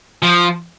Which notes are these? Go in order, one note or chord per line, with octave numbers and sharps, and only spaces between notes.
F3